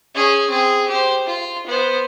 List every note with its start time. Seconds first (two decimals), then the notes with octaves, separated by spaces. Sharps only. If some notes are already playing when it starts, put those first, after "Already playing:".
0.15 C#4 G#4
0.50 C4 G#4
0.88 G4 C5
1.27 F4
1.67 B3 C5